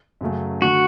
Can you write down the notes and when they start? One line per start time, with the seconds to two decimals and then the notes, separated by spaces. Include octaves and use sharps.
0.21 F#2 C#3 F#3 A3
0.62 D3 A3 F#4